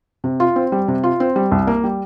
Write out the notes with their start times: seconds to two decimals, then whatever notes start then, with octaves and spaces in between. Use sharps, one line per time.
0.24 C3
0.40 F4
0.56 C4
0.72 G3
0.88 C3
1.03 F4
1.20 C4
1.36 G3
1.51 C2
1.67 A#3
1.84 G3